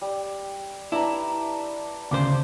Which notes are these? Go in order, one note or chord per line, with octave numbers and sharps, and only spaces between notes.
G3
D4 E4 B4 A#5
D2 C#3 C5 D6